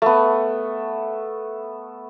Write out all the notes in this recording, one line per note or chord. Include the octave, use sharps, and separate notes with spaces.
A3 B3